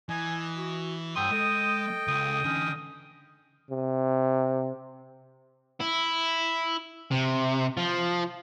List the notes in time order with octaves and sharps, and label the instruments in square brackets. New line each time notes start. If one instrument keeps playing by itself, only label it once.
[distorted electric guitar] E3 [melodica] D#5 [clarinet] G#5
[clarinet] F#4
[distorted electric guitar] G2 C6 [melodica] F#3 A4 [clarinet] G5 [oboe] D#6
[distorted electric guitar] G#3 [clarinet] A4 [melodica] D#5 G5
[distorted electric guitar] C#2 [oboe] D#6
[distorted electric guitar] D3 E3 [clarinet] C#4
[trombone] C3
[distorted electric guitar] E4
C3
F3